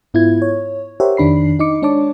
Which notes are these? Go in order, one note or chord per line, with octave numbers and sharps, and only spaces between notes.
G#2 B3 E4 F4 G#6
C#5
G4 A#4 C5 C#5 E5 F#5
F2 D#3 D4 B5 C7
D#4 D#5 D6 C#7
G#3 D4 C#5 A5 D6